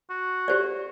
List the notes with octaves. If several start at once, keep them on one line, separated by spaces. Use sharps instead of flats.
F#4
G4 C5 D5